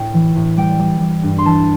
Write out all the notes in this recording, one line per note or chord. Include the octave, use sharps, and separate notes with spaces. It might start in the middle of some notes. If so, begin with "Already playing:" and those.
Already playing: A2 G5
E3
A2
G3 G5
G3
G3
G2
C6
E3 A5